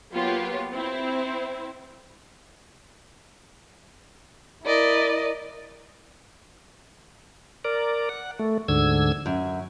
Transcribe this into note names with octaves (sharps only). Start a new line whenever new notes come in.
F#3 A#3 B3 F4 G4 C#5
C4 E4
E4 A#4 D5 D#5
A#4 D5
F#5
A3
D2 G#2 D3 E6 G#6
F#2